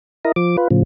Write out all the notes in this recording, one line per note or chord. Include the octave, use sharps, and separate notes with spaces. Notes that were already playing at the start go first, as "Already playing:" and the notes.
E4 A#4 D#5
F3 D6
F4 B4
A2 C#3 F3